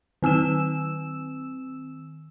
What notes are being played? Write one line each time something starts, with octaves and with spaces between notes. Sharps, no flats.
D#3 C4 E6 E7